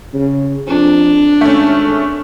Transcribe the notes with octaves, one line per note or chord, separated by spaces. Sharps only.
C#3
F2 D4
G#1 A3 C#4